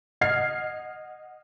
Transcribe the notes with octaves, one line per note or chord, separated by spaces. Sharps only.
D#5 F#5 F6 G#6 C7